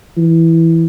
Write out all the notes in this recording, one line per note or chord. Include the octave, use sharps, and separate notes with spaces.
E3